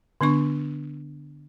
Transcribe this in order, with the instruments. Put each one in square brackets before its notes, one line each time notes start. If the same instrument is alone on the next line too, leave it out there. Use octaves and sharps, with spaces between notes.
[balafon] D3 B3 D4 C#6